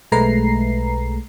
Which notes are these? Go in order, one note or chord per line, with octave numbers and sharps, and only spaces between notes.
B1 G#3 A3 B4 A#5 C7